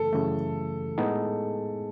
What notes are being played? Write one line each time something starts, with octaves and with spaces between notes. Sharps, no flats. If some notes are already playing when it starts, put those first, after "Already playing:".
Already playing: F#2 C#3 E3 A3 A4
F#2 C#3 E3 A3
A2 G#3 B3 D#4 G#4